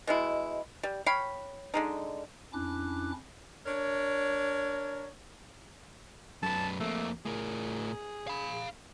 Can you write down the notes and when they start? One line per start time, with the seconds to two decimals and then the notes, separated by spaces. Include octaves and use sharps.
0.07 B2 G#3 E4
0.83 G3
1.06 C#5 F5 G5 B5
1.74 D3 G#3 D#4
2.53 F2 C#4 D4 E4 D6 F#6
3.65 D4 A#4 C#5
6.43 F#2 B4 A5
6.80 F2 A3 A#3
7.25 A2 G#4 A#4
8.27 F5 B5